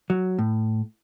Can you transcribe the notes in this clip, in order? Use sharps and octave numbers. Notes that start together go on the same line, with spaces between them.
F#3
A2